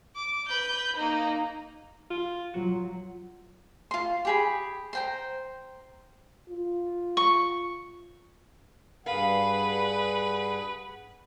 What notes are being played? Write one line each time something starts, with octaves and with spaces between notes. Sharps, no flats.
D6
B4 G6
A#3 D#4
F4
F#3 F4 F#4
F4 C6
G4 G#4 B5
C5 G5 A#5
F4
C#6
G2 G#4 B4 F5 F#5